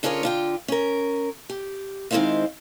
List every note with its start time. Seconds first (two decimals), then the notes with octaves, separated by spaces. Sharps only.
0.03 D3 C#4 F4 G#4 A#4 C#5
0.23 D3 F4 G5
0.68 C#4 A#4
1.49 G4
2.11 D#3 G#3 C4 E4 C5 F5